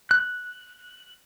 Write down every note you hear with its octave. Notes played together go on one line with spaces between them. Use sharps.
F#6